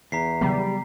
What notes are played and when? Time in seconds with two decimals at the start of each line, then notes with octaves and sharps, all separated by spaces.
0.12 E2 A#5 B6 C7
0.41 C#3 F#3 G3 B3